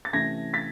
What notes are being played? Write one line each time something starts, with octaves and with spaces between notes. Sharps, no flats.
A6
C3 E3 A3 C#4 G#6 A#6
A6 B6